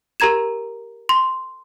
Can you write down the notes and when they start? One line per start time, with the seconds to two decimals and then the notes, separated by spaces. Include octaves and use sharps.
0.20 G4 A#4 A#5 G#6 E7
1.09 C6